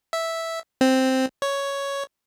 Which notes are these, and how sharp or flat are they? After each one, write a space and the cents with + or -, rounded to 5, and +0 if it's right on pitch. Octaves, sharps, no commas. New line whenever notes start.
E5 -5
C4 +0
C#5 +5